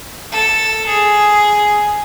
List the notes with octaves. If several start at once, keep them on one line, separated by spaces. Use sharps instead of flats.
A4
G#4